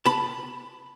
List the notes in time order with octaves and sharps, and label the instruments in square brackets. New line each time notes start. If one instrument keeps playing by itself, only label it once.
[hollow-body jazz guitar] A5 B5